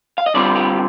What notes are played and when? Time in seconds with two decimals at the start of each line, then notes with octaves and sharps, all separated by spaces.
0.18 F5
0.26 D#5
0.34 D3 G3 C4 F4 D5
0.56 G4